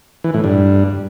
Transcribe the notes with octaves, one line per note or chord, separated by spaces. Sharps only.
E3
A2
G2